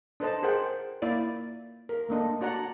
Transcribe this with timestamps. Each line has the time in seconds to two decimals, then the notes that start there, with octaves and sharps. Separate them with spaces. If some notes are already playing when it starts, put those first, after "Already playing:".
0.20 D4 A4 B4 C5 D#5 A5
0.43 G#4 A#4 C5 F#5 G5
1.02 A#3 E4 D5
1.89 A#4
2.09 A3 A#3 D4 D#5
2.41 D4 F#4 D5 F#5 A#5